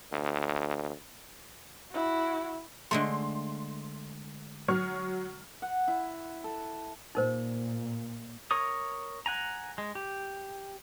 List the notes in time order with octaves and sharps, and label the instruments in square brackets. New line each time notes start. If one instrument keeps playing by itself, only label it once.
[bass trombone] D2
[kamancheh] E4 F#4
[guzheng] D3 G#3 A3 [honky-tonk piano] C6
[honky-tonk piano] F#3 C#6 F6
[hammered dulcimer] F#5
E4
A4
[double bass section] A#2 [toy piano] D#4 A#4 C5
[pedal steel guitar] A#4 C#5 D#6
F#5 G#5 A#5
G#3
G4